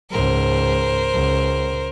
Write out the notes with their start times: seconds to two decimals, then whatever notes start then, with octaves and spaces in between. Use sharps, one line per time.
0.11 C#2 G#2 A#4 C5
1.14 C#2